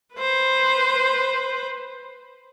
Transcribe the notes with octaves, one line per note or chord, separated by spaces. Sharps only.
B4 C5